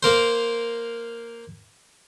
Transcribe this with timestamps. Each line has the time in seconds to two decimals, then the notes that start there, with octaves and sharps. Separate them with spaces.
0.03 A#3 A#4 C5